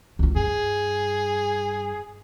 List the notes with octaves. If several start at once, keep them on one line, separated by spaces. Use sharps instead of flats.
C#2 F4
G2 G#4